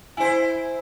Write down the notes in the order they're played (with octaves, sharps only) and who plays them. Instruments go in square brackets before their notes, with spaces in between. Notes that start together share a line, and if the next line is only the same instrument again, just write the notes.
[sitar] E4 C5 [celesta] G#5